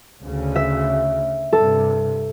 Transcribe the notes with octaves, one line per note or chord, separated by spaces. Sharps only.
D2 C#3
E5
G2 C3 A4